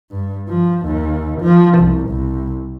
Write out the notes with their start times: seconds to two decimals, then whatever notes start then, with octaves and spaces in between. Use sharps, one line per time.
0.11 G2
0.49 F3
0.86 D#2
1.41 F3
1.78 C2
2.09 C2